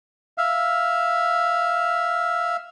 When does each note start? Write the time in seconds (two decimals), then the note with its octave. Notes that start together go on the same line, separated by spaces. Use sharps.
0.38 E5 F5